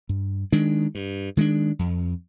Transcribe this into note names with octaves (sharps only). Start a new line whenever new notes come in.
G2
D#3 G#3 D4
G2
D#3 G#3 D4
F2